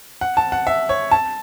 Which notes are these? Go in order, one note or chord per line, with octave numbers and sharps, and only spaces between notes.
F#5
A5
F#5
E5
C#5
A5